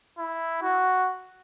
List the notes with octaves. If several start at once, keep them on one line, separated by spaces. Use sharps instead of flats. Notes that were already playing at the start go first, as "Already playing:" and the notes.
E4
F#4